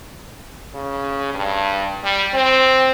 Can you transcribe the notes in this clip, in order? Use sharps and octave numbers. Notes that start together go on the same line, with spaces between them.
C#3
G2
G3
C4